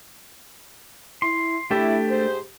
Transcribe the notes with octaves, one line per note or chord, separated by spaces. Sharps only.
E4 C6
A3 D4 E4 G4 A4
G#2 G#4 C5